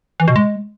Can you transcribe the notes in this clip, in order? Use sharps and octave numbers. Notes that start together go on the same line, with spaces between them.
E3
B2
G#3